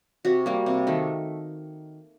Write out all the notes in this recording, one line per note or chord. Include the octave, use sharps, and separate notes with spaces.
C3 F#4
G3 A#3
C3
D#3 A3